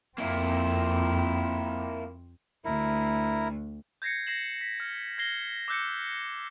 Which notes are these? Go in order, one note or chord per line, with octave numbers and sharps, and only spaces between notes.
F2 A#3 C4 E4
D2 E4 A#4
G6 G#6 A#6 C7 C#7
A#6 C7 E7 F#7
B6
F6
G#6 A#6 C7 G7
D6 E6 F#6 G6 A6 C#7